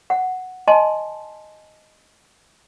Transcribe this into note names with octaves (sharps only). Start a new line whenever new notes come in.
F#5
D#5 G#5 A5 C6